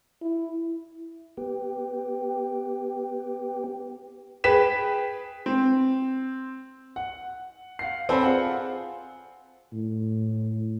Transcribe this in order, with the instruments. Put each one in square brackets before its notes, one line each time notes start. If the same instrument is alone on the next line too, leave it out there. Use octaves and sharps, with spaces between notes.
[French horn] E4
[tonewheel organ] B3 G4
[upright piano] G#4 B4 G5 B6 E7
C4
[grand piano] F#5
F5 F#5 C7
C4 A4 C5 D5 G#5 B5
F4 G#4 F#5
[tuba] A2